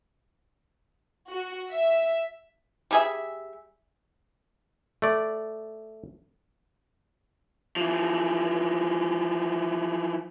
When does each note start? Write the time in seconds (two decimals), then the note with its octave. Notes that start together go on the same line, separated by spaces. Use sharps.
1.28 F#4
1.73 E5
2.91 G3 G#4 E5
5.02 A3 D5
7.76 E3 F3